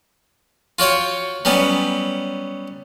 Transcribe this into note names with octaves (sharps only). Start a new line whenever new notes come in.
F4 F#4 C#5 G5
F#3 G3 B3 C#4